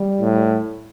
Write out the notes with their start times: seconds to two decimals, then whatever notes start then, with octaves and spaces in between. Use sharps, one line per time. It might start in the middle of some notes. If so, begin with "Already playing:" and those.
Already playing: G3
0.21 A2